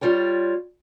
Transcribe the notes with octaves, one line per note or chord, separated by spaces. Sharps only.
G3 F4 C#5 G5